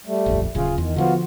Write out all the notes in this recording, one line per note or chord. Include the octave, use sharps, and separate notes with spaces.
G3 A3
D#1 A#1 F2
D1 C#3 F4 G#4
E2 D#3
D3 E3 F3 B3 F4 F#4